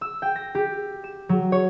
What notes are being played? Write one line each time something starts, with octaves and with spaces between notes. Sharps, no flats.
E6
G5
A#6
G4
E7
F#3
C#5